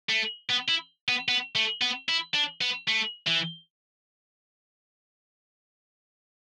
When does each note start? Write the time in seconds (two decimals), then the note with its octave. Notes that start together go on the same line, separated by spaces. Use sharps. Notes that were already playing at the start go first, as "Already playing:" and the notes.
0.09 A3
0.49 B3
0.68 E4
1.08 B3
1.28 B3
1.55 A3
1.81 B3
2.08 E4
2.34 D4
2.61 B3
2.88 A3
3.27 E3